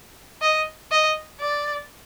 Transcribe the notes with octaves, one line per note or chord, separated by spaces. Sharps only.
D#5
D#5
D5